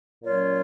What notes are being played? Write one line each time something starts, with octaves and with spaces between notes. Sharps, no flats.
A#2 F#3 C#4 F4 C#5